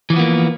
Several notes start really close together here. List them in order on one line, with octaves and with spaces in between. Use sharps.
E3 F3 B3 A#3